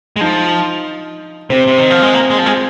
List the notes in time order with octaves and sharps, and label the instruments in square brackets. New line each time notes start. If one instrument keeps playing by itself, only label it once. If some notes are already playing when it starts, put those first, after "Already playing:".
[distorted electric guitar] G#3
[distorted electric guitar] F3 [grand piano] D#4
[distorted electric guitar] C3 [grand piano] C4
[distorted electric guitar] C3
D#3
F3
G#3
A#3
G#3
F3
G#3